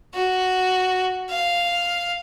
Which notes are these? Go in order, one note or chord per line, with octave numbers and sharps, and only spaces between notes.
F#4
F5